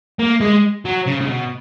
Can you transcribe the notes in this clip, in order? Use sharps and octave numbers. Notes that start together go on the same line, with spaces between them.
A#3
G#3
F#3
C#3
C#3
B2